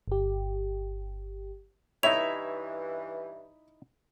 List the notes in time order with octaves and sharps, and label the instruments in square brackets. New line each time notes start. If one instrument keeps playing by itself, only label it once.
[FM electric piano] G1 G4
[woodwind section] G2 E3 [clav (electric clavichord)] D#4 E4 [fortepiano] C#5 E5 [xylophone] F7